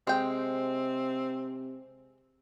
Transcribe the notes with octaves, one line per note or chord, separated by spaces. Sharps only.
C3 G#3 C4 G5